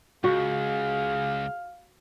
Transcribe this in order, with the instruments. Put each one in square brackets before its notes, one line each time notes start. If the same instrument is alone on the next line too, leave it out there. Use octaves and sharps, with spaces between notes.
[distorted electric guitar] C#2 [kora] F#4 [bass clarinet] G#4 [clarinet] F5